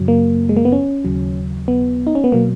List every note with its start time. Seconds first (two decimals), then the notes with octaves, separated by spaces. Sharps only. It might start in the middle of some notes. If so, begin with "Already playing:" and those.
Already playing: F#2 C#3 F#3
0.08 A#3
0.49 G#3
0.57 A#3
0.65 B3
0.72 C#4
1.04 D#2 C#3 F#3
1.68 B3
2.07 D#4
2.15 C#4
2.24 B3
2.32 B2 F#3 A#3